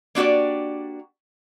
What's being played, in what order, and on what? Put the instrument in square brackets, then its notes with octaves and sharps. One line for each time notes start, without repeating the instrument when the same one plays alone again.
[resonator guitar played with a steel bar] A#3 D4 F#4 G4 D5